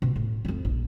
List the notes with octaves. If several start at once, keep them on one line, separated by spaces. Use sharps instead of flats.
B2
A2
F2 C4
A#1